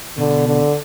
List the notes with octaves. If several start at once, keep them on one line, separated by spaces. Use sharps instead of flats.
B2 D3
D3